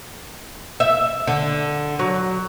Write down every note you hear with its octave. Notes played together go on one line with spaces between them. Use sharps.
E5
D3
F#3